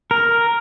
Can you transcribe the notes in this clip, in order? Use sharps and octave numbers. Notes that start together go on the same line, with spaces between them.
A#4